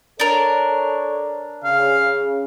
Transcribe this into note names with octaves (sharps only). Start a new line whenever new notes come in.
D4 A4 A#4 C#5 D5
C#3 F5